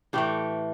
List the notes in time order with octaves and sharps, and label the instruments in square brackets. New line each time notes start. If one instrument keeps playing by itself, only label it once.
[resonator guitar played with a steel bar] A2 E3 A3 G4